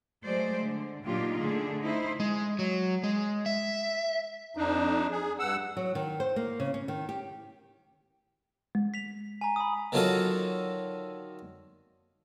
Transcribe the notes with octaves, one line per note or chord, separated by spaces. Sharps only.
F#3 G#3 A3 C5 D5
D3
A#2 F#3 D4 D#4 F4 G4
D3 A3 D4 G#4
D#4 E4 C5
G#3
F#3
G#3
E5
F2 D4 D#4
G#4
G2 F#5 E6
F#3
D#3
C5
A#3
C#3
C#4
D#3
G4
G#3
B6 F7
G#5 A#5
B5 D#6
D3 D#3 F#3 F4 F#4 A4